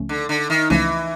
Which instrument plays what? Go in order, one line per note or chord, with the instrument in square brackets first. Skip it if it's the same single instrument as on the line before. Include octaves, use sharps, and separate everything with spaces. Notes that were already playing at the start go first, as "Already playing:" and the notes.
Already playing: [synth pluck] C#2 C#3 F3 A3 C#4
[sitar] D3
D3
D#3
[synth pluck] C#2 C#3 F3 A3 C#4 [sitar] E3